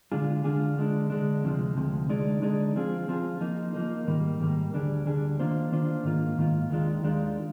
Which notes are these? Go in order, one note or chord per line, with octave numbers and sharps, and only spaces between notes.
D3 G#3 D4 F4 G#4
D3 G#3 D4 F4 G#4
D3 G#3 D4
D3 G#3 D4
D2 C3 F3 G#3
D2 C3 F3 G#3
D3 G#3 D#4 G#4 D5
D3 G#3 D#4 G#4 D5
F3 C4 F4 G#4
F3 C4 F4 G#4
F3 A#3 D#4
F3 A#3 D#4
G#2 D#3 G3 A#3
G#2 D#3 G3 A#3
D2 D3 G3 D4 G#4
D2 D3 G3 D4 G#4
D#3 A#3 D4 F4 C5
D#3 A#3 D4 F4 C5
G#2 D#3 A#3 F4
G#2 D#3 A#3 F4
D#2 D#3 G#3 D4 F4
D#2 D#3 G#3 D4 F4